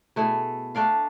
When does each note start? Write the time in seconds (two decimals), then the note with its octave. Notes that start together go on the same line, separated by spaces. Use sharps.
0.16 B2 A3 E4 G#4
0.75 A3 D4 D5 F5